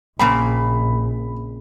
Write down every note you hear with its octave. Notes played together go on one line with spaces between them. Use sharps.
A#1 C#3 A#3 C4 B5